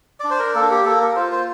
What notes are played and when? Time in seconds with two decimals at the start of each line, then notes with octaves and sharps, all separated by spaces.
0.20 D4 D5
0.30 C5
0.39 A#4
0.55 A#3 A4
0.71 G4
0.85 A#3 A4
1.01 A#4
1.16 F4 C5
1.32 C5